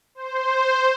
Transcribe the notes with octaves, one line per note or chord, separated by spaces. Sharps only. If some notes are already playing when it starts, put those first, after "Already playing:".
C5